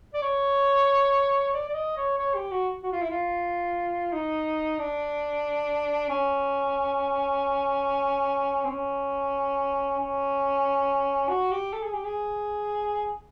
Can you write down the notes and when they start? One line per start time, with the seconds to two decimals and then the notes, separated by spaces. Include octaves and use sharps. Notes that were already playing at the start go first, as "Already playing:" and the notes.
0.14 D5
0.22 C#5
1.54 D5
1.68 D5
1.74 D#5
1.97 C#5
2.18 C#5
2.35 G4
2.51 F#4
2.83 F#4
2.92 F4
3.02 E4
3.10 F4
4.13 D#4
4.79 D4
6.09 C#4
8.64 C4
8.69 C#4
9.99 C#4
11.29 F#4
11.51 G4
11.73 A4
11.83 G#4
11.94 G4
12.04 G#4